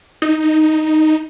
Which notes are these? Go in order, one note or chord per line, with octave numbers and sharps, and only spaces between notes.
D#4